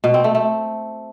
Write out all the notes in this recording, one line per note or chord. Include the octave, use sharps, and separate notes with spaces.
B2
C4
A3
A3